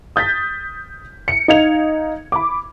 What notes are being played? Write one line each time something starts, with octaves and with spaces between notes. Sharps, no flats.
D#6 G6 A6 B6
C#7
D#4 F5 G#6 F7
B5 D6